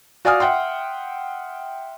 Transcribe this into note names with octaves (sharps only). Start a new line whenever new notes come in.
F#4 D5 F5 G#5 D#6 F6
E5 F#5 G5 C6